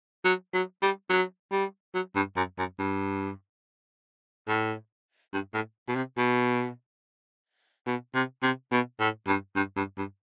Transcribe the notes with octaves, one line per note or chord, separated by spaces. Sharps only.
F#3
F#3
G3
F#3
G3
F#3
G2
F#2
F#2
G2
A2
G2
A2
B2
C3
B2
B2
C3
C3
B2
A2
G2
G2
G2
G2